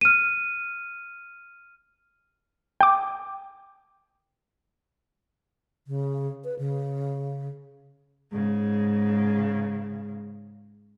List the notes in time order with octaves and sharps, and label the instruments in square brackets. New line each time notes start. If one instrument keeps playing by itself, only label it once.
[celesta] F6 D#7
[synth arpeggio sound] G5 D6
[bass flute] C#3
B4
C#3
[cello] G#2 C#3